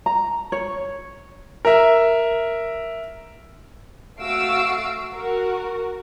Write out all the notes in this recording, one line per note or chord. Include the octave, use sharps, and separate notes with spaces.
A#5
C#5
A#4 E5
A3 F#4 F5 E6 C7 D7
F#4 A#4